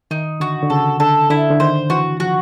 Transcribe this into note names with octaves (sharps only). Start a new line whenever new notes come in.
D#3 D#4
D3 F#4
D3
C#3 A4
D3 A4
D3 E4
D3
D#3 C5
E3 F#4
F3 F#4